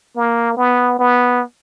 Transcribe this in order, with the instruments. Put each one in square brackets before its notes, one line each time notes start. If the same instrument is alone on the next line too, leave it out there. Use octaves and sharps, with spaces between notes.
[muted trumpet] A#3
B3
B3